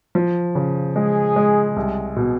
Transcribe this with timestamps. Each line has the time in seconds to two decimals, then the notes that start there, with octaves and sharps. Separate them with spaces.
0.15 F3
0.55 C#3
0.96 G#3 G#4
1.36 G#3
1.76 C2
2.16 B2